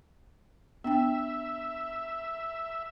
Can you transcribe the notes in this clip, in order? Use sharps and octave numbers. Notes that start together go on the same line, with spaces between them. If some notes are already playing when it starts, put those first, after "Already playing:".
B3 D4 E5 G5